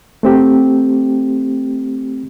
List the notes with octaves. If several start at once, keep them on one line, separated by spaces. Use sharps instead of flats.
A3 C4 G4